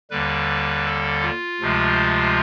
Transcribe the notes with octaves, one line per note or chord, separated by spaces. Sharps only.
D#2 D3 G3 B4
A4
F4
D2 C3 F3 G#3